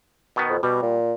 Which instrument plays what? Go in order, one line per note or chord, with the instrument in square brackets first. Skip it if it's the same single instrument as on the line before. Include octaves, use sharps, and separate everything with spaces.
[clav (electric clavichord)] B2 D#3 B3
[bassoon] F2
[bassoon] B2 [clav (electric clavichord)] G3
[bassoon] A#2